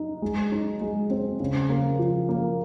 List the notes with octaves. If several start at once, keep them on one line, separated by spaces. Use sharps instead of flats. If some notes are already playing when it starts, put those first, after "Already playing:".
Already playing: D#4
G#3
D#4
G#3
C4
C#3
A#3
F3
A#3